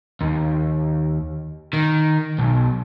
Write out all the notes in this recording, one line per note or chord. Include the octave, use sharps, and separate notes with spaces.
D#2
D#3
B1